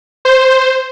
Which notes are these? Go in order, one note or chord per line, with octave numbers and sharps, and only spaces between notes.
C5